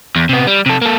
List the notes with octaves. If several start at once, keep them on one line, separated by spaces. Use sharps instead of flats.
E2
C3 B3
G3
C3 A4
A#3 A4